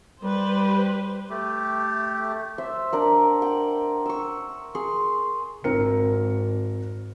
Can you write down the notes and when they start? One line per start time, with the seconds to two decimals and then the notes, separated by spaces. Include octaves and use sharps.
0.23 G3 G4 B4 C5
1.30 A3 G4
2.58 C5 E5
2.92 D4 A#4 F#5
3.42 F#5 G5
4.05 C#6 E6
4.75 G#4 C6 C#6
5.64 G#1 C4 A#4 C#7